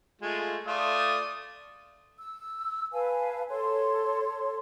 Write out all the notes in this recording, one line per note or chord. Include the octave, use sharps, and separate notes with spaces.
G#3 A3 F4
A3 F4 D5 D#6
E6
B4 F5 G#5 A5
A4 C#5 C6